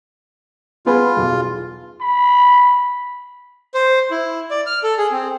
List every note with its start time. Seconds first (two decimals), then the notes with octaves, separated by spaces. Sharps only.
0.86 B3 F4 G#4 B4
1.16 B1 E2
2.01 B5
3.74 C5
4.11 E4
4.51 D5
4.66 F6
4.83 A4
4.98 G#4
5.12 C4